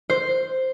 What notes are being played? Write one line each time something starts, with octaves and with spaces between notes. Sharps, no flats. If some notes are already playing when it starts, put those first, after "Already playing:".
C5